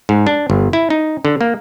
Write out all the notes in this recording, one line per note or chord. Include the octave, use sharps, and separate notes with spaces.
G#2
D4
G1
E4
D#4
D3
A#3